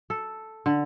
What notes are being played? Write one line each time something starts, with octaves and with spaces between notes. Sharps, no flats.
A4
D3